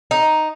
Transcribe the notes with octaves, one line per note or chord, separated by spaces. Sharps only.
D#4